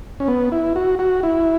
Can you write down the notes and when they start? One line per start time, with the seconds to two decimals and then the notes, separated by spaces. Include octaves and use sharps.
0.20 C#4
0.28 B3
0.52 E4
0.76 F#4
0.99 F#4
1.23 E4